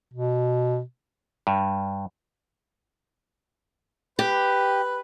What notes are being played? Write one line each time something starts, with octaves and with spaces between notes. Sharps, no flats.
B2
G2
G4 B4